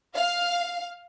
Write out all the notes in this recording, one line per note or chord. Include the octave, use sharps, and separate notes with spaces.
F5